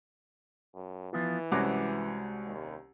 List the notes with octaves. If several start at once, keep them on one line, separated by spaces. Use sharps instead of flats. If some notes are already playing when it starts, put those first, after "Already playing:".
F#2
E3 F3 B3 F4
C2 G#3 C#4 F#4 F#5 D6
D#2